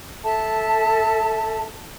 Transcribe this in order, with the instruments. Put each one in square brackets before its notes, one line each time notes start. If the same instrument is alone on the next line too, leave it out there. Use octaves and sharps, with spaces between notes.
[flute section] A4 E5 A5